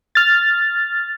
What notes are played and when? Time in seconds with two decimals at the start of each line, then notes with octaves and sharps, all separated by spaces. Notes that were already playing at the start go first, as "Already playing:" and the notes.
0.15 F6 A6